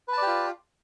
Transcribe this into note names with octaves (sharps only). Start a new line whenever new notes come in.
F4 G4 B4 D5 A5